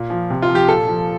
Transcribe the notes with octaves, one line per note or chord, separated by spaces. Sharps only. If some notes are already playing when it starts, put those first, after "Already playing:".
Already playing: A#2
F3
C3
F4
F3
G4
A#2 A4
F3